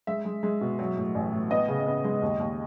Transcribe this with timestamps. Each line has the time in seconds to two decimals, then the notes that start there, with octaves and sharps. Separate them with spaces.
0.07 G#3 E5
0.25 G#3
0.43 G#3
0.61 B2
0.79 F#3
0.97 A2
1.15 A1
1.33 A2
1.51 B3 D#5
1.68 C#3
1.87 B3
2.04 G#3
2.22 D#2
2.39 D#2